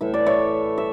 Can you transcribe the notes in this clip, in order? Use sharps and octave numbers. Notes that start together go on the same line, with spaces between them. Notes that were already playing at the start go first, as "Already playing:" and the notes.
A2 E3 A3 E5
D5
C#5 E5
E5